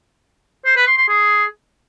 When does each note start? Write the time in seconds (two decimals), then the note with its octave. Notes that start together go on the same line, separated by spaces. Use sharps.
0.66 C5
0.77 B4
0.87 C6
0.98 C6
1.08 G#4